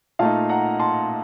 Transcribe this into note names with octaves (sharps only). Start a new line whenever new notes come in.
A#2 A3 D#4 F5 A5
F#5 A#5
A5 C6